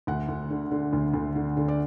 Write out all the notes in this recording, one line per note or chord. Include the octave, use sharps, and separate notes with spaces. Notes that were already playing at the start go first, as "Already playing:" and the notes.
D2 F#5
D2
D3
D3
D2
D2
D3
D3
D5